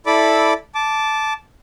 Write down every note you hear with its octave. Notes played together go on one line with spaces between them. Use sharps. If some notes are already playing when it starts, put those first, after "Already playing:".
E4 A4 D5 B5 D6
A5 D6